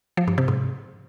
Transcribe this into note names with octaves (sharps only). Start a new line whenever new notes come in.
F3
G2
C3
G#2